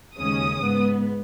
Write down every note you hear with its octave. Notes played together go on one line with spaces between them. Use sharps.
D#2 C#3 G#3 C#4 D#6
G#2 G#3 B3